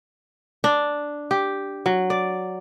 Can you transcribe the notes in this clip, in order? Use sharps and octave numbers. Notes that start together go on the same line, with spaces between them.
D4
G4
F#3
D5